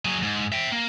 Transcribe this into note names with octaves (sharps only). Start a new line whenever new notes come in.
F#3 G#4
G#2
E5 G5
A#3